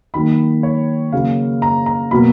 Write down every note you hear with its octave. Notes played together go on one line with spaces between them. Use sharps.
D#3 F#3 A#3 B5
C#5
C#3 F#3 A#3 F5
A#5
A#5
B2 F#3 A#3 B5